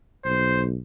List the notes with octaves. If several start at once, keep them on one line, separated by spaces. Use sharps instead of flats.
B1 C5